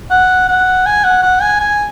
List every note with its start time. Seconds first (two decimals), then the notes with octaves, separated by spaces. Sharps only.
0.11 F#5
0.48 F#5
0.86 G#5
1.04 F#5
1.23 F#5
1.42 G#5
1.60 G#5